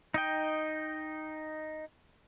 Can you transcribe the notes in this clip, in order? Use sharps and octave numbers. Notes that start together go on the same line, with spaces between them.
D#4 D#5 G5